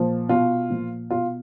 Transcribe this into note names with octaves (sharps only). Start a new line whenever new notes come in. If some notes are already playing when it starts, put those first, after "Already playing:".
Already playing: A#2 F3
B2 F4
A#2 F3
B2 F4